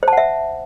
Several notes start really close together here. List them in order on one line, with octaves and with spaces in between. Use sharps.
C5 A5 F#5 E5